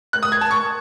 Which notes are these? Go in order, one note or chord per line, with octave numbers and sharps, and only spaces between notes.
F#6
D#6
G#6
A5
C#6